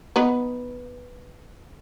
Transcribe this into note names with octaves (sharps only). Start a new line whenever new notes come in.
B3 D#4 B4